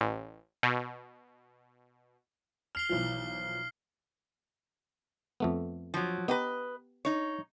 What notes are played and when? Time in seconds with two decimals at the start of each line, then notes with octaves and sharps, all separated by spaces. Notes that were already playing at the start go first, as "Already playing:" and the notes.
0.01 A1
0.63 B2
2.75 F6 C7 F7 G7
2.89 B1 E3 F3
5.40 F2 A3 B3
5.94 F3 F#3
6.28 B3 G4 B4 D#5 A#5
7.05 D#4 C#5